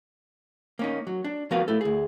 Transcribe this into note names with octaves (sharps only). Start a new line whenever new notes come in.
A#3 C#4 D#4
F#3
D4
F3 B3 F#4 A#4 B4 F5
A3 E4 A4
D2 G#4